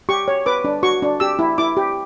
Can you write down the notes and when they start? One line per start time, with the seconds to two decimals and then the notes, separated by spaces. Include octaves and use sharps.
0.09 G4 C#6
0.28 C#5
0.46 B4 D6
0.64 D4
0.83 F#4 C#6
1.02 D4
1.20 G4 E6
1.39 E4
1.58 E4 D6
1.77 G4